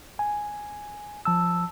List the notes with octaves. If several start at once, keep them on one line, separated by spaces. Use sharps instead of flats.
G#5
F3 A5 E6